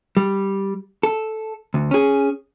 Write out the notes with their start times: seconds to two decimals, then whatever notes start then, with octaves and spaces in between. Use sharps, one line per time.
0.17 G3
1.03 A4
1.74 D2
1.91 C#4 G#4